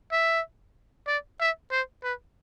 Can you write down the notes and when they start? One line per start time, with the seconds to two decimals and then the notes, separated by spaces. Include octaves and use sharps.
0.12 E5
1.07 D5
1.41 E5
1.72 C5
2.04 B4